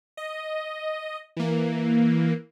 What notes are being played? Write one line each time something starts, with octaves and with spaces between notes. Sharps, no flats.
D#5
E3 A#3